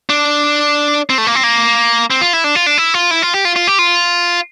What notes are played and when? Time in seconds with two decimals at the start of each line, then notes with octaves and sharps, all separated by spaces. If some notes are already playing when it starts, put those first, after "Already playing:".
0.10 D4
1.10 C4
1.18 A3
1.27 A#3
1.35 C4
1.43 A#3
2.10 C4
2.21 F4
2.33 E4
2.44 D4
2.55 F4
2.66 D4
2.78 E4
2.94 F4
3.11 E4
3.22 F4
3.34 G4
3.45 F4
3.56 F4
3.67 G4
3.79 F4